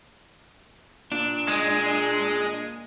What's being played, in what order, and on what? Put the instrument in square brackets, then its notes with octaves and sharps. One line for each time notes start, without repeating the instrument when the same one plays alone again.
[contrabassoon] A#2 [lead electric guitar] D4
[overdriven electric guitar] G#3